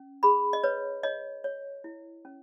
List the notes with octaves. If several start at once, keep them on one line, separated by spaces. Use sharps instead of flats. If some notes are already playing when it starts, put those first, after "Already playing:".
Already playing: C#4
G#4 B5
D#5
B4 C#5
C#5 D#5
C#5
E4
C#4